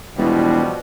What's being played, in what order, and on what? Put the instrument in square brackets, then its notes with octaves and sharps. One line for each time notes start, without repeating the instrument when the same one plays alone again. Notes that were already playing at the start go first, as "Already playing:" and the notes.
[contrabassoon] E1 [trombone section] B2 F3 G3 [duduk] E4